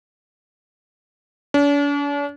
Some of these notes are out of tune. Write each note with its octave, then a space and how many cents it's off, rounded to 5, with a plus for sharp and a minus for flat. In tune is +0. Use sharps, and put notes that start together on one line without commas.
D4 -45